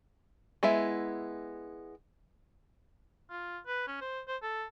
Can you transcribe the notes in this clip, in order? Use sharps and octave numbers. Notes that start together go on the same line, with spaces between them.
G#3 B3 E4 E5
F4
B4
C#4
C5
C5
A4